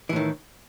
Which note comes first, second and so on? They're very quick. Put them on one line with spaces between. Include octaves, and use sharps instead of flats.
E3 A2 D#3